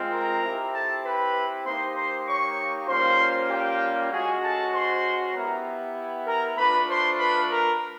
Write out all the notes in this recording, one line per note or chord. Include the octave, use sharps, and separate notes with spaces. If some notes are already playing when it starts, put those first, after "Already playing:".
Already playing: G#3 C4 F4
A#4 A#5
C4 E4 G4
A4 A5
B4 B5
A#3 D#4 G4 C5 C6
C5 C6
C#5 C#6
G3 A#3 C#4 F4 C5 C6
G4 G5
G#3 C#4 F#4 G#4 G#5
A4 A5
C5 C6
B3 E4 G4 A#4 A#5
A#4 A#5
A3 D4 F4 B4 B5
C5 C6
B4 B5
A#4 A#5